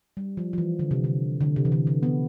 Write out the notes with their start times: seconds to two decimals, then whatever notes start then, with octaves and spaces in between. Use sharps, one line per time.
0.17 G3
0.37 F3
0.53 F3
0.58 E3
0.79 D3
0.91 C3
1.04 D3
1.41 D3
1.56 C3
1.65 E3
1.72 D3
1.87 D3
2.03 B3